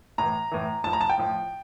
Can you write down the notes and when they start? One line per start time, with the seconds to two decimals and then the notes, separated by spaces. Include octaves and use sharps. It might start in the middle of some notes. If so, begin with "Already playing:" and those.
0.18 A2 E3 A#5
0.52 A2 E3
0.84 A2 F3 A5
0.93 A#5
1.01 A5
1.09 G5
1.18 A2 F3